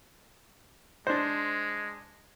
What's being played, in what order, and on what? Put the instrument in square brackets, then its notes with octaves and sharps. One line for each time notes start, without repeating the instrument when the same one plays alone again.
[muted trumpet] G#3 [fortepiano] D4 C5